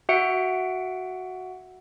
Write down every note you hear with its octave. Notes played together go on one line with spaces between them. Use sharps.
F#4 E5 F#5 C#7 D7